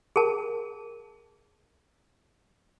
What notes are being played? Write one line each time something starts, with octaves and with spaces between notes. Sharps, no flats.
G#4 A#4 A5